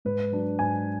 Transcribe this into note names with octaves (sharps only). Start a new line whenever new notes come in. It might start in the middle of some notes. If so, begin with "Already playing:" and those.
G#2 B4
F#3 D4
G#2 G#5